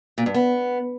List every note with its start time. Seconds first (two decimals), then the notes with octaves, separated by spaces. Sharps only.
0.18 A#2
0.26 G2
0.34 B3